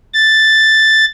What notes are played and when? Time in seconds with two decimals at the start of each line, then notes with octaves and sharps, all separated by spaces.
0.14 A6